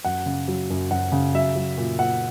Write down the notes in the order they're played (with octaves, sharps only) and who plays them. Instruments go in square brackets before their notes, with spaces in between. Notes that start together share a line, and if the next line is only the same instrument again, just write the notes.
[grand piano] F#2 F#5
C#3
F#3
F#2
F#2 F#5
C#3
F#3 E5
F#3
A#2
A#2 F#5